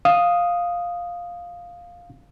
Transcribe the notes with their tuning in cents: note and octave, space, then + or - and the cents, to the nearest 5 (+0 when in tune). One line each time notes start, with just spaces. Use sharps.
F5 +5 D#6 +0